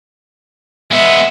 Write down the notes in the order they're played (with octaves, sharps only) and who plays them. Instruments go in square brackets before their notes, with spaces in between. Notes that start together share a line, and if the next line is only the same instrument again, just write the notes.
[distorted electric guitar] G#3 B3 [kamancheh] E5